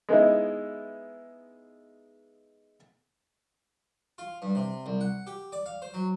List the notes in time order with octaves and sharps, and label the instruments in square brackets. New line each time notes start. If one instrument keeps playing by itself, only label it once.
[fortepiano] G#3 B3 D#4 E4
[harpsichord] F4
G2
C3
C2
F#5
G4
D5
F5
C5
F#3